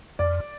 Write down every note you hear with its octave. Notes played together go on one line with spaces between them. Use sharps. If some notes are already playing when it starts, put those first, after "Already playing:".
F2 D5